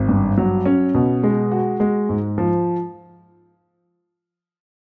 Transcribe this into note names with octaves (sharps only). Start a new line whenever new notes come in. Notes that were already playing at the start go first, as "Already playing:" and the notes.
Already playing: G#1
G2
F#3
C#4
B2
G#3
F#4
G#3
G#2
F3